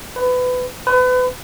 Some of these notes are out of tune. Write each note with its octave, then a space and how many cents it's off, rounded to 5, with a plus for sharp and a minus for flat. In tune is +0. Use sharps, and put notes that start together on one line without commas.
B4 +25
B4 +35